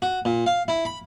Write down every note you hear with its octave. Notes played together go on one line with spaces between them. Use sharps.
F#4
A#2
F5
E4
B5